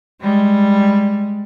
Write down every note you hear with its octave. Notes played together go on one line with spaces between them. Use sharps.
G3 G#3